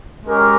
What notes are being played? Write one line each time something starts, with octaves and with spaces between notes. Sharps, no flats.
G#3 C#4 G4 A#4